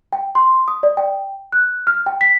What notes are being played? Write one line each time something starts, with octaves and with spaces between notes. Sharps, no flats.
G5
C6
D#6
D5
G5
F#6
F6
G5
B6